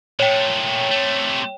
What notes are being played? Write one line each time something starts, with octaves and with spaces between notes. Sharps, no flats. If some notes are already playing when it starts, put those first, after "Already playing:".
A#2 A3 C#5 G5
C3 A3